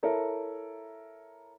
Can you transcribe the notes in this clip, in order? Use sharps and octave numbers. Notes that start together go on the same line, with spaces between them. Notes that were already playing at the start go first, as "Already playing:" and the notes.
E4 A4 A#4 C#5 E5